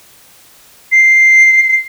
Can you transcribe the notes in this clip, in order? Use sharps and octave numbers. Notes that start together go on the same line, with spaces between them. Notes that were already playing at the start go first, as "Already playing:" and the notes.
C7